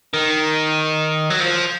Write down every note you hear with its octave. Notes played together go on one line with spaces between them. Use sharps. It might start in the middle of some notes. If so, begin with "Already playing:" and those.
D#3
F#3
F3